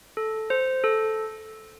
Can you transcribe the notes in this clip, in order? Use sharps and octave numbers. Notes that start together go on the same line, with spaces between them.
A4
C5
A4